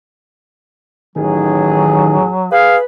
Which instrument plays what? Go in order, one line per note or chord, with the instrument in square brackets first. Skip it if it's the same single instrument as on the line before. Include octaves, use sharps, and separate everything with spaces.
[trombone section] A1 G#4 [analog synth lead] D#3 [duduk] F#3
[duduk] G#4 [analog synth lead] B4 [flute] F5